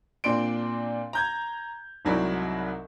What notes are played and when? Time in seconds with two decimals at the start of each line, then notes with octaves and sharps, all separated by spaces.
0.24 A#2 C4 D4 C6 D7
1.13 A#5 G6 G#6
2.05 C2 G#2 F#3 C4 E4 D5